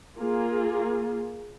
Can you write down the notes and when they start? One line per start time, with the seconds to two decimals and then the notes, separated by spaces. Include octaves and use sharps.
0.18 A#3 F4 G#4